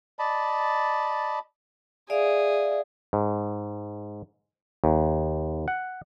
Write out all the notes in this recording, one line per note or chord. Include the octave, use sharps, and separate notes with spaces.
D5 D#5 A5 B5
G#4 D5 E5 F5
G#2
D#2
F#5